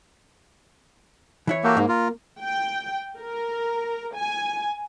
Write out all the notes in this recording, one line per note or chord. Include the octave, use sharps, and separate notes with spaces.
E3 E4 C#5
A#3 F#4 G4 A4
G#2 A#3
F4 A#4
G5
A#4
G#5